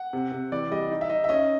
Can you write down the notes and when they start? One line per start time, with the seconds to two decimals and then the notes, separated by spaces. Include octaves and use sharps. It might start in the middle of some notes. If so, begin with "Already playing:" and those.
Already playing: F#5
0.13 C3
0.32 C3
0.52 E3 D5
0.71 G3 D#5
0.91 D#4
1.01 E5
1.09 D#4 D#5
1.24 E5
1.29 C#4 D#5